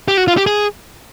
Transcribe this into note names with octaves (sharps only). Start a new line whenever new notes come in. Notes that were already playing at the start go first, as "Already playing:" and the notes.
G4
F#4
F4
G4
G#4